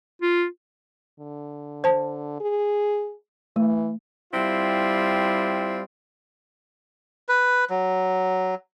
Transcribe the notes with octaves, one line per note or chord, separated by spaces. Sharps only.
F4
D3
C5 A5
G#4
E3 A3
G3 C4 E4 F4
B4
F#3